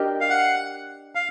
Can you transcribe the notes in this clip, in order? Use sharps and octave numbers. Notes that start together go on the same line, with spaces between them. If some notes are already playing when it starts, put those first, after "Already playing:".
Already playing: D4 G4 A#4 D#5
F5
F#5
F5